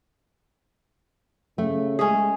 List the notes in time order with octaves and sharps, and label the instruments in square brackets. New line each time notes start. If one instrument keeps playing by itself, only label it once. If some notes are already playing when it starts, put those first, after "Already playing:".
[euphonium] C#3 [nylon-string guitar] A3
[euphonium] G#3 [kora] C#4 G#4